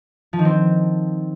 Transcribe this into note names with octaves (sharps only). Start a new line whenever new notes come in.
F3
D#3
C4